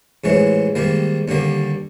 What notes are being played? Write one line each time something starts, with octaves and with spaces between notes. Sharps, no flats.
A1 G#2 E3 G#3 C#4
G#2 D#3 G3 A#3
D#2 D3 G3 A#3